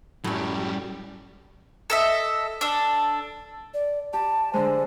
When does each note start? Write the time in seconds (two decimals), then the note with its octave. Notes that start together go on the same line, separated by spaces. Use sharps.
0.24 F#2 A2 F#3 G3
1.90 A4 D#5 E5
2.61 D4 A4
3.74 D5
4.13 G4 A5
4.54 D3 G#3 C5